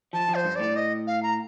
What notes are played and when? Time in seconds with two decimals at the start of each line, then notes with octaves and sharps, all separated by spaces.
0.13 F3 A5
0.29 F3
0.35 C5
0.45 G2
0.56 A2 D5
0.76 D#5
1.07 F5
1.23 A#5